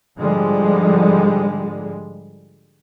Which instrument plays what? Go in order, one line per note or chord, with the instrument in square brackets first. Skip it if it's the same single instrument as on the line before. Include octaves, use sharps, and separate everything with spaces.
[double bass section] G#2 D3 F3 G3 G#3